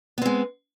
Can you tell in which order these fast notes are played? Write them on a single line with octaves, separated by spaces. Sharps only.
B3 C4 G#3